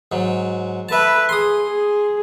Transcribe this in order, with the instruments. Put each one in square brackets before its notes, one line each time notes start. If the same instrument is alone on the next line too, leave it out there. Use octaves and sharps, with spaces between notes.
[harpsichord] G#2 F#3
[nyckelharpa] A4 B4 [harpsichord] E5 A5
[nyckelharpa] G#4 [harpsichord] C6 D#6
[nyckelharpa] G#4